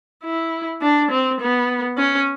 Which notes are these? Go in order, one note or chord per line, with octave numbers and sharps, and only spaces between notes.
E4
D4
C4
B3
C#4